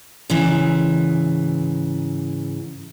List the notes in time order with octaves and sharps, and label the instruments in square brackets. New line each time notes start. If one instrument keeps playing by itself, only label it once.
[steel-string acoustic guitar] G#2 C#3 E3